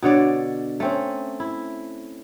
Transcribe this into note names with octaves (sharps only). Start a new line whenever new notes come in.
B2 D3 C#5 D5
A3 C4 C#4
E4